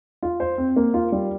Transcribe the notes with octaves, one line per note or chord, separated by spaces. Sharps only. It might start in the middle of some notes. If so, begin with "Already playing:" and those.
F4
C5
C4
A#3
F4
G3